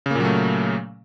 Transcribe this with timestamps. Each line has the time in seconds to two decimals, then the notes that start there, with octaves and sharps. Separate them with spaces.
0.06 C#3
0.11 A#3
0.15 A#2
0.20 F#3
0.25 A3